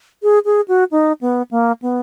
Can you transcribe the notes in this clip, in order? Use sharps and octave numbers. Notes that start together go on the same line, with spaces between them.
G#4
G#4
F#4
D#4
B3
A#3
B3